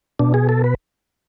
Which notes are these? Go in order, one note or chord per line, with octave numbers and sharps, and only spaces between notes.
B2 D4
G#4
A4
B4